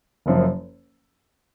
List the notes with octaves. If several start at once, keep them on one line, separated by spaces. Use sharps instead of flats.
F#1 F#2 F3